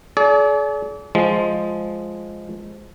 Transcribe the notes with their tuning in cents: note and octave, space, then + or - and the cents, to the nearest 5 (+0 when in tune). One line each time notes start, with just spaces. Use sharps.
G#4 +45 D5 -35
F3 +0 G#3 +0